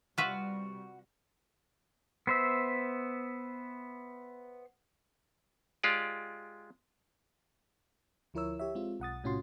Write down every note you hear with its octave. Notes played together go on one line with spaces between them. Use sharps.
C3 G3 F4 F#4 B4 E5
B3 C5 E5
G#3 F4 G4 D5
D2 F3 E4 A#4 C#5 E6
G4 C#5 E5
G#3 C4 F4
B1 F#5 D#6 A6
A2 C3 C#4 F4 F#4 C6